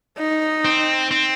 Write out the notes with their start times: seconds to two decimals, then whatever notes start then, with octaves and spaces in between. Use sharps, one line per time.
0.19 D#4
0.65 C4
1.11 C4